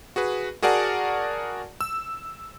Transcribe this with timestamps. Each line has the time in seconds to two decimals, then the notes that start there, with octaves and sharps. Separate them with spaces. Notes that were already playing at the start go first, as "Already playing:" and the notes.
0.16 F#4 G#4 B4
0.62 F#4 G#4 A#4 D5 F#5 A5
1.81 E6